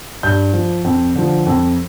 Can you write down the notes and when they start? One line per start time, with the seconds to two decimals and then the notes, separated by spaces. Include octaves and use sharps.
0.23 G2 G6
0.53 F3
0.84 F2
1.15 D3 F3
1.46 F2